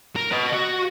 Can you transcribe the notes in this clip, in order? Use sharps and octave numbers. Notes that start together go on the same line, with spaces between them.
A#4
B4 D#5
F#4